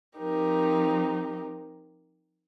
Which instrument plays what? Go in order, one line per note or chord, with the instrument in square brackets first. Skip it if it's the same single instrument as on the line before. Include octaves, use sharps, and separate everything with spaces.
[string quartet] F3 C4 D#4 G4 A#4